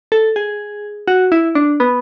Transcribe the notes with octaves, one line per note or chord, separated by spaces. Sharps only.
A4
G#4
F#4
E4
D4
B3